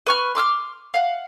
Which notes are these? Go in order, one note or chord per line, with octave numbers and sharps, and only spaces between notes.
B4 C#6 F6
C6 D6 E6 F6
F5 F#5